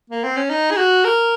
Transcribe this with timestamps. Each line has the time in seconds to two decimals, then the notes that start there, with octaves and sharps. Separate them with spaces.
0.10 A#3
0.24 C4
0.37 C#4
0.50 D#4
0.71 G#4
0.77 F#4
1.05 A#4